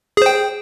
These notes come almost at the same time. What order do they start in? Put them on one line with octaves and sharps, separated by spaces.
G#4 C5 G5